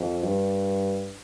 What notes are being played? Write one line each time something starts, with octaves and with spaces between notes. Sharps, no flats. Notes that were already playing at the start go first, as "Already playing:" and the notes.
Already playing: F2
G2